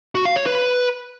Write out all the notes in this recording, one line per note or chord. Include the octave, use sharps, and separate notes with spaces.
F#4
F5
C#5
B4